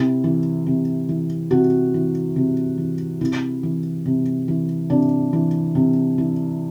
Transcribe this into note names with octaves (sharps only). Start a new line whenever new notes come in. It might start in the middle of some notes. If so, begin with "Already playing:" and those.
Already playing: C3 E4
E3
C3
E3
C3 F#4
E3
C3
E3
C3 E4
E3
C3
E3
C3 D4
E3
C3
E3